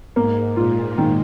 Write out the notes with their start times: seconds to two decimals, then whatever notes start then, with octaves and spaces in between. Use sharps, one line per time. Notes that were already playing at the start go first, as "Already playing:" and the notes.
0.15 G#2 A#3
0.56 A#2 F4
0.98 D#3